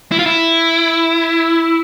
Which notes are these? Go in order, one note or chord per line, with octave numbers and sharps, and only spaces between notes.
E4
F4
E4